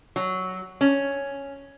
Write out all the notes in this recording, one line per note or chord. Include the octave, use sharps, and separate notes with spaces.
F#3
C#4